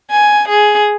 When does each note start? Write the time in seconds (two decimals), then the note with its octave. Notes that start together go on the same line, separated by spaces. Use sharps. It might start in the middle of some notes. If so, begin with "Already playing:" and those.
0.11 G#5
0.48 G#4